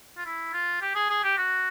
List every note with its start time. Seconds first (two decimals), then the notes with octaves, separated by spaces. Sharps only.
0.17 F4
0.25 E4
0.53 F4
0.82 G4
0.95 G#4
1.09 G#4
1.23 G4
1.37 F#4